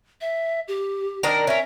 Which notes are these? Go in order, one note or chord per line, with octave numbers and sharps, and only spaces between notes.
E5
G4
D#3 D4 A#4
C#4 A#4 E5